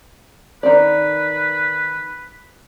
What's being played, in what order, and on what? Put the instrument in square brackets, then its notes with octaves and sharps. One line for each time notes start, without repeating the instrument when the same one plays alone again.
[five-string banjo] D#3 C4 D5 [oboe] B4